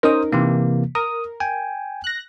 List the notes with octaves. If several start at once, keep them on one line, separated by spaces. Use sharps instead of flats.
C#4 D#4 A#4 C5 D#6
C3 E3 A#3
A#4 D#6
G5 G#5
F#6 A#6